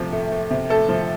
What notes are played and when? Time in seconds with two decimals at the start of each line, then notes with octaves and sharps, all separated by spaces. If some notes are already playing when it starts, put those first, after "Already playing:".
Already playing: C3 F3 A3
0.12 A3
0.32 A3
0.51 C3
0.69 A3 A4
0.89 F3